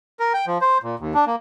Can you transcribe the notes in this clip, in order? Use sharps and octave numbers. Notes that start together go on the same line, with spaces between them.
A#4
G5
F3
C5
A#2
D#2
D4
A#3